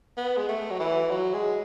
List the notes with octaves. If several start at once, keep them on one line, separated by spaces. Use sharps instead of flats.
B3
G#3
A3
F#3
E3
F#3
G#3